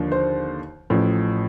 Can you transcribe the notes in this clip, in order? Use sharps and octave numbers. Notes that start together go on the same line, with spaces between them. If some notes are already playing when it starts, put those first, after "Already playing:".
Already playing: D#2 D3 F3
C5
A1 A2 F3